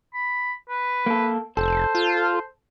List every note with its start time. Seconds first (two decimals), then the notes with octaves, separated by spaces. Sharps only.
0.14 B5
0.69 B4
1.06 A#3 A4
1.57 F1 A4 C5
1.95 F4